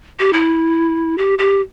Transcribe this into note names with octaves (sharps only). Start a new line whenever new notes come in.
G4
E4
G4
G4